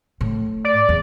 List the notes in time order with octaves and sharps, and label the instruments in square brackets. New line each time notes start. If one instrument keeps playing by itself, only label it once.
[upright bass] A2
[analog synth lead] D5
[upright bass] E2